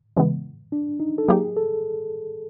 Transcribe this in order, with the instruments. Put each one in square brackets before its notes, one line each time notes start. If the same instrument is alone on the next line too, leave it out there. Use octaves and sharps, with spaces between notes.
[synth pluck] C#3 E3 G#3 B3
[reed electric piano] D4
D#4
A4
[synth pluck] F#3 A#3 D#4 G4 [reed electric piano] G#4
[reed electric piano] A4